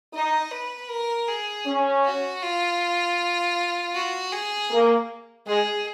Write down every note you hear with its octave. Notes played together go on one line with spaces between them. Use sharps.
D#4 D#5
B4
A#4
G#4
C#4
F#4
F4
F#4
G#4
A#3
G#3 G#4